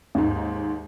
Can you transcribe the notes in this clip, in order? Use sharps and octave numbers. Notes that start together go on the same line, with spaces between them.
D#2 G#2